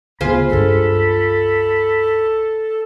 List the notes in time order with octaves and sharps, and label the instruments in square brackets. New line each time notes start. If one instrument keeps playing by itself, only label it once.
[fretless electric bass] D2 C#3 B3 [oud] F4 G#4 C5 [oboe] B5
[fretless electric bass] C#2 G2 [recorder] A4